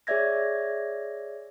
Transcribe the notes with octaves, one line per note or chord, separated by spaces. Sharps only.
G#4 C#5 D5 E5 G#6 A#6